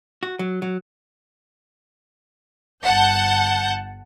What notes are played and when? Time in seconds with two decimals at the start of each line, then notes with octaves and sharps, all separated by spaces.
0.23 F#4
0.39 F#3
0.62 F#3
2.84 G1 F#5 A5 G6